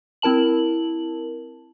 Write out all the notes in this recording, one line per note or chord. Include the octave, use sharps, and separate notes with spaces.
C4 E4 A#4 A5 F#7